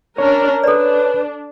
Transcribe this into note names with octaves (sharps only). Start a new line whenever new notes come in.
C#4 D4 A#4 C#5
D4 A4 B4 D5